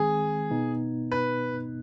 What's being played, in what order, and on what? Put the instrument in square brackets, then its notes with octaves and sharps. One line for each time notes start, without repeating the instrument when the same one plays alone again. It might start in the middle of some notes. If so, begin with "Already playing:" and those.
Already playing: [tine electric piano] D#3 G#3 C4 [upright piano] G#4
[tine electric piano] B2 B3 D#4
[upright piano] B4